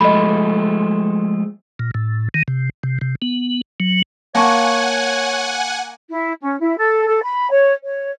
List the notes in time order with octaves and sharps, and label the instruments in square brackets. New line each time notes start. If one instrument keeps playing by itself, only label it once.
[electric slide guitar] F3 G#3 A3 [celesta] D#5 B5
[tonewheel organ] A#2
A2
D#3
C3
C3
C3
B3
F#3
[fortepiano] A#3 [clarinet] C#5 [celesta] F5 A5 C#6 [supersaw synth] F#5 G#5
[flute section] E4
C#4
E4
A4
A4
B5
C#5
C#5